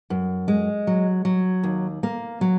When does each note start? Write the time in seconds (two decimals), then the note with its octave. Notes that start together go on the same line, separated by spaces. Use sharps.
0.10 F#2
0.48 G#3
0.87 F#3
1.25 F#3
1.63 D#2
2.03 A#3
2.41 F#3